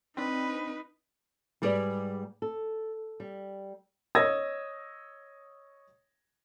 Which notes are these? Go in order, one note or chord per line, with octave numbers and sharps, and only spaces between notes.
C4 D4 D#4 B4
G#2 G3 G#4 B4 D5
A4
G3
C#5 D#5 D#6 E6 G#6 A#6